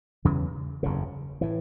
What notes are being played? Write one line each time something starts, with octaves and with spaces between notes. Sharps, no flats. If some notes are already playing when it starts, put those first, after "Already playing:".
E2 C#3 E3 G3
F#1 E2 C#3
A2 E3